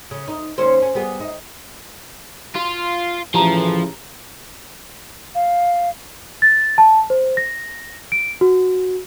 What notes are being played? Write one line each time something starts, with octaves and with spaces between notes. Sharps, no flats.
C#3
D#4
D#2 C#4 C5
C#4
G3 B3 G#4
D#4
F4 F#4
A2 C#3 E3 F3 G4 A5 A#5
F5
A6
A5
C5
A#6
D7
F#4